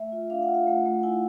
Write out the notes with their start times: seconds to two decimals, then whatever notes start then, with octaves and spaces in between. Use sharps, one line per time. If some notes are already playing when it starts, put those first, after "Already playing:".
Already playing: A3 E5
0.12 F4
0.30 D4 F5
0.42 F#5
0.49 F4
0.54 F5
0.67 A3 F#5
0.85 A3
1.03 E4 G#5